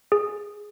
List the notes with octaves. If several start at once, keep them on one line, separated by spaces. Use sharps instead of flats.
G#4